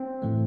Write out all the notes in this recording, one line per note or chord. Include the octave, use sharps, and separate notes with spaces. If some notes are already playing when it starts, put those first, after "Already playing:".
Already playing: C4
A2 E3 A3